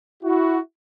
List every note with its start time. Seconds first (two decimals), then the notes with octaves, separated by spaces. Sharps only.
0.23 E4 F#4